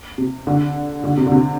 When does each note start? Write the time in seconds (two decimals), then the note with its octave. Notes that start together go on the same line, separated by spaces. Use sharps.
0.18 C3
0.47 D3
1.04 D3
1.17 C3
1.26 D3
1.32 C3